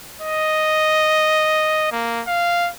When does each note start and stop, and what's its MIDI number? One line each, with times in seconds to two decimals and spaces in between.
0.21 1.87 75
1.91 2.21 58
2.27 2.70 77